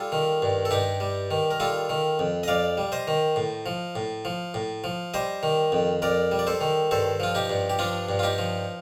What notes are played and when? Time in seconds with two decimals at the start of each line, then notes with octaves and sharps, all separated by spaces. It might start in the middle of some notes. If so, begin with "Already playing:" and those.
Already playing: G3 F4 A4
0.12 D#3
0.42 G2
0.65 A4
0.71 G2 D#4 G4
1.00 G3
1.31 D#3
1.51 A#4
1.60 G3 F4 A4
1.90 D#3
2.19 F2
2.43 D#5
2.48 F2 D5 F5
2.78 G3
2.92 C5 D#5
3.07 D#3
3.36 A2
3.66 F3
3.96 A2
4.25 F3
4.54 A2
4.84 F3
5.14 G3 C5 D#5
5.43 D#3
5.72 F2
6.02 F2 A#4 D5
6.32 G3
6.39 D5
6.47 A4 C5
6.61 D#3
6.91 G2 A4 C5
7.20 F3 F4
7.35 D#4 G4
7.50 G2
7.70 G4
7.79 F3 D4 F4
8.09 G2
8.19 F4
8.23 D#4 G4
8.38 F3